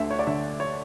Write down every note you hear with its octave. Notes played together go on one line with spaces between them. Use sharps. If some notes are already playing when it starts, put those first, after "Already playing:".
Already playing: D2 D3 E5
C#5
D5
D3 E5
C#5